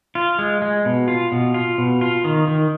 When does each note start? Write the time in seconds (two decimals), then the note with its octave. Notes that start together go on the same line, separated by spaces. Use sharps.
0.15 F4
0.39 G#3
0.62 G#3
0.85 B2
1.08 F4
1.32 B2
1.54 F4
1.78 B2
2.01 F4
2.24 D#3
2.48 D#3